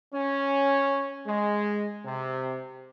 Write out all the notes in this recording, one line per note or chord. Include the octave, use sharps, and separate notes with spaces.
C#4
G#3
C3